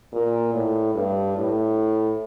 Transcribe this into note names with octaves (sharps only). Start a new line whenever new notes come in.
A#2
A2
G2
A2